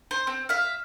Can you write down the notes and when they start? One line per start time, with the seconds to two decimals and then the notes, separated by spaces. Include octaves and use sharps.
0.11 C5
0.27 C4
0.49 E5 F5